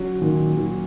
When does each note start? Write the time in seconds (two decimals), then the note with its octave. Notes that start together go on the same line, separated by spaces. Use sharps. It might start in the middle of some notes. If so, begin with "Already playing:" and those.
Already playing: F#3 C#4
0.21 A#2 D#3
0.57 F#3